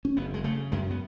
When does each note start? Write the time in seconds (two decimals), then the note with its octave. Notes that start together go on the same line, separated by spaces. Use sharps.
0.05 C#4
0.17 F#1 B3
0.34 G#3
0.44 C#3 A3
0.72 F#2 G#3
0.91 B3